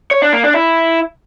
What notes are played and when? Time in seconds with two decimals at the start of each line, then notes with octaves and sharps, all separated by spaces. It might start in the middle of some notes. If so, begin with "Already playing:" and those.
0.11 C#5
0.22 D4
0.33 A#3
0.44 D4
0.54 E4